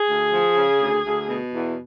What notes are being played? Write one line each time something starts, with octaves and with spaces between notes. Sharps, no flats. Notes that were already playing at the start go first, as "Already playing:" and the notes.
Already playing: G#4
D2
F3
C#3
D2
D2
B2
E2